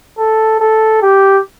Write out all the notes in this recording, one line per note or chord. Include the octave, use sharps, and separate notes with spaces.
A4
A4
G4